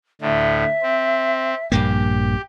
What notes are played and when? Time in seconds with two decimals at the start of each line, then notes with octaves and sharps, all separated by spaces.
0.21 D2 A2 D3 E5
0.82 C4
1.72 A#1 G2 A#3 G4